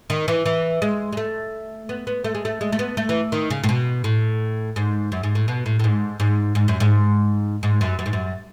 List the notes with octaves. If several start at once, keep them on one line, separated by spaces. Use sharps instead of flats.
D#3
E3
E3
G#3
G#3
A3
B3
B3
A3
G#3
A3
G#3
A3
B3
A3
E3
D#3
C#3
A2
B2
A2
G#2
F#2
G#2
A2
B2
A2
A2
G#2
G#2
G#2
F#2
G#2
G#2
F#2
F#2
G#2
F#2